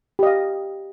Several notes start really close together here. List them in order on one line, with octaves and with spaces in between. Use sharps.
G4 D#5 F5